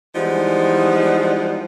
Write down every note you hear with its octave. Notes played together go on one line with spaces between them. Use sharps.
E3 F3 G3 G#3 B3 D#4